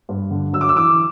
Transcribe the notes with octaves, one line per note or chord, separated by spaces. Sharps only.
G2
D3
F#2 E6
D6
E6
E3 D6